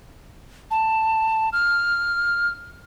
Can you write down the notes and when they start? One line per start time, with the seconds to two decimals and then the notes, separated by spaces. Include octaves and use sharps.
0.71 A5
1.53 F6